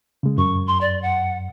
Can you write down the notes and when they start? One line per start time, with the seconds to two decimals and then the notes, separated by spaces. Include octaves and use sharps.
0.23 C#3 G#3
0.38 F#2 C#6
0.67 C6
0.81 D5
1.02 F#5